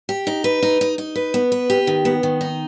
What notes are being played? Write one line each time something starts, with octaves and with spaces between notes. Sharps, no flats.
G4
D#4
B4
D#4
D#4
D#4
B4
B3
B4
G4
D#3
B3
D#3
D#4